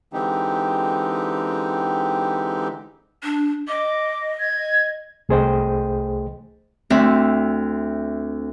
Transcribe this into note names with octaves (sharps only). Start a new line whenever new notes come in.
D3 E3 G#3 C4 D#4 G4
D4
D#5 D6
G#6
C2 A3 G#4 C5 D#5 G5
D2 C4 E5